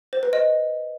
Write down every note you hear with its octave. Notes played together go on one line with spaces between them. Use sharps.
C5
B4
D#5